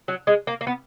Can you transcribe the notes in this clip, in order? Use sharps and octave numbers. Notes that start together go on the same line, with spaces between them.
F#3
G#3
A#3
A#3
B3